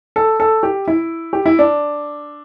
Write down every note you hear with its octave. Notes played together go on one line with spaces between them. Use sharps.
A4
A4
G4
E4
G4
E4
D4